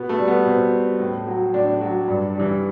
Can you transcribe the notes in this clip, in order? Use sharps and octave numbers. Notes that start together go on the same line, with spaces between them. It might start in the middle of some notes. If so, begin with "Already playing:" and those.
Already playing: B2 B3
A3
G3
B3
B2 C4
G3
A2
F#3
A2 D4
F#3
G2
E3 G3